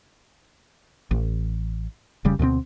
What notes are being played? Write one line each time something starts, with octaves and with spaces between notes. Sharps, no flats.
A1
F1 C#3 G3
D2 B2 F#3 C4